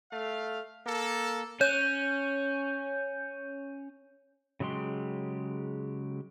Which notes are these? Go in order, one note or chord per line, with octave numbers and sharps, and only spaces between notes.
A3 F5
A#3 A4
C#4 C#5 G6
C#3 F#3 G#3 G4 C6